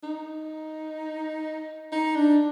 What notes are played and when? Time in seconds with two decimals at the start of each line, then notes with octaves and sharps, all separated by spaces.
0.03 D#4
1.92 D#4
2.16 D4